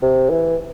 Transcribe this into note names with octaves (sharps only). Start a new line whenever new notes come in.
C3
E3